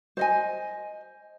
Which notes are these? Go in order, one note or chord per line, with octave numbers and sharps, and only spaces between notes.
C5 D#5 G#5